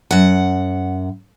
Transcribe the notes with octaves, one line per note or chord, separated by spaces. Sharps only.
F#2 F#5